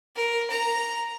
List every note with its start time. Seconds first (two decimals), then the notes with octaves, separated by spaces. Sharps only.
0.16 A#4
0.50 A#5